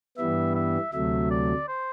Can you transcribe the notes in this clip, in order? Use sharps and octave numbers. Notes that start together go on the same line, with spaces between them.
G2 E3 G3 B3 E5
E5
D2 C3 F#3 A3 E5
D5
C5